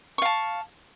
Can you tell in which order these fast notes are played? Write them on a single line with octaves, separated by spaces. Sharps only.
C#6 F5 A5